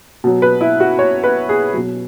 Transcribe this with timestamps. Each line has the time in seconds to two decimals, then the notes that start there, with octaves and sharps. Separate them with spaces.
0.24 B2 F#3
0.42 B4
0.61 E4
0.80 F#4
0.99 C#5
1.24 B4
1.49 G#4
1.73 B2 F#3